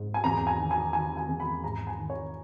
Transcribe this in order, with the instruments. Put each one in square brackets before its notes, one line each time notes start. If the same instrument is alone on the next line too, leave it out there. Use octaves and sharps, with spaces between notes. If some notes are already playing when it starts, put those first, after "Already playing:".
Already playing: [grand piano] G#2
G#5
E2 A#5
G#5
D#3
G#5
D#3 G#5
G#5
E2
B5
G#2 A#5
G#5
D#3
C#5